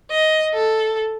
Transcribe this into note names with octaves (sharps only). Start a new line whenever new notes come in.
D#5
A4